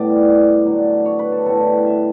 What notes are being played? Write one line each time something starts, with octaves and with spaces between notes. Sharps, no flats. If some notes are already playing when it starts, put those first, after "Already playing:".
Already playing: A2 G3 B3 D5
D3 F#3 A3
C#5
B4
A4
A2 G3 B3 A4
E5